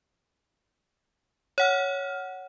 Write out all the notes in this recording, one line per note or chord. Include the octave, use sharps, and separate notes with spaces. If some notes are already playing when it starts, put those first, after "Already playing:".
C#5 F#5 F6